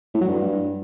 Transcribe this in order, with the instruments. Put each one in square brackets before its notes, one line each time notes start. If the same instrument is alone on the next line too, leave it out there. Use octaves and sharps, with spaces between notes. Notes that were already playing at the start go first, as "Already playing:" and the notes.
[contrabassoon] A2
F#3
G2